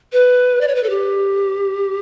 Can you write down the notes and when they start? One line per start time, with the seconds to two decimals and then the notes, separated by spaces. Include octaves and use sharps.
0.13 B4
0.61 D5
0.68 C#5
0.75 B4
0.83 A4
0.90 G4